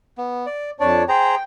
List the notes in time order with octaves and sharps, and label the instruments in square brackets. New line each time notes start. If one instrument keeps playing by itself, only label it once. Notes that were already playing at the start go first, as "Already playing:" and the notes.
[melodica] B3
D5
[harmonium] F2 C#5 A5 [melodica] D4 D5
[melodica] G#4 C5 A#5 [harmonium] G5